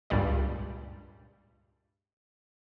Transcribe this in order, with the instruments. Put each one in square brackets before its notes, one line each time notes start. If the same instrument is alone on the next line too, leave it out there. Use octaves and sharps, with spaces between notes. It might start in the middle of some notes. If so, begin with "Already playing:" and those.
[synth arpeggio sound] C#2 G2 A#2 G3 D5